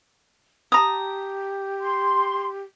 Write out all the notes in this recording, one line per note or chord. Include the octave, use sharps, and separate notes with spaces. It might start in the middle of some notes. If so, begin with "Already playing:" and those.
G4 A5 A#5 D#6
C6